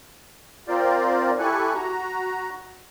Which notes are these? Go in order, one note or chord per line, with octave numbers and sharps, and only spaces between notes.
C4 F4 A#4 C5 D5
E4 G4 A4 G#5 C#6 F#6
F#4 A#5